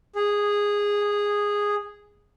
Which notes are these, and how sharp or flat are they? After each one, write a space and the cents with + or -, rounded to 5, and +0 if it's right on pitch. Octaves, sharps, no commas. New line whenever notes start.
G#4 -10